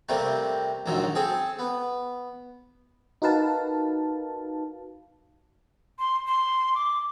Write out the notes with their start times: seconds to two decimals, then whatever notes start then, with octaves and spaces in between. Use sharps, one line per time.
0.09 C3 G3 A3 A#3 C4
0.86 A#1 D#2 G#2 F#3 E5
1.15 C4 G#4 A4
1.59 B3
3.22 D#4 F#4 A#4 B4 F5 A5
5.99 C6
6.27 C6
6.75 D6